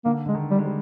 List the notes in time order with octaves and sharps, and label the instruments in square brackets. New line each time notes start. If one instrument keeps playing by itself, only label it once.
[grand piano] D3 [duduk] A#3
[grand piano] D3 [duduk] G#3
[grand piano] D#3
[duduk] G3
[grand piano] G#3
G3